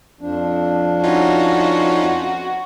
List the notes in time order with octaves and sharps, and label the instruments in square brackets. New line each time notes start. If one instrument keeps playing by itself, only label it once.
[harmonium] F2 F3 D4
[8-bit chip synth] C#4 D#4 F4 [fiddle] F#4